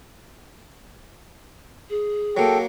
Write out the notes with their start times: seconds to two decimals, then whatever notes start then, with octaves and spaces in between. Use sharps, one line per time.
1.90 G#4
2.37 F#3 A#3 A4 G5